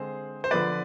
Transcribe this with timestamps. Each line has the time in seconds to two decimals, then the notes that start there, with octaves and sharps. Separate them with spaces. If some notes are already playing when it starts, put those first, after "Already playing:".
Already playing: D3 G#3 C4 G#4 C5
0.44 C5
0.51 D3 F3 B3 B4 D5